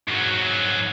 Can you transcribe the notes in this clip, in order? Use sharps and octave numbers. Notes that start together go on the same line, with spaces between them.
G#2 F#3